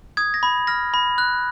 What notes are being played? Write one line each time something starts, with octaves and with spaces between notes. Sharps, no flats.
D#6 G#6
A#6
B5
F6 A#6
B5
F#6